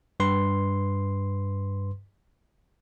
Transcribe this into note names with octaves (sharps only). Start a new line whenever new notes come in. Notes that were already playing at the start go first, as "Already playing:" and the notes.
G2 B4 C6